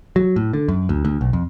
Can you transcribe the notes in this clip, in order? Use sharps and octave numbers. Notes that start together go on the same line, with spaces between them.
F#3
A2
D3
F#2
D2
D2
B1
F2